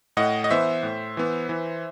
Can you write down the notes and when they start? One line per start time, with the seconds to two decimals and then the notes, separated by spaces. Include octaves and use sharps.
0.17 A2 D#5 F#5
0.44 D#5
0.51 E3 B3 C5 E5
0.83 A2
1.17 E3 B3
1.49 E3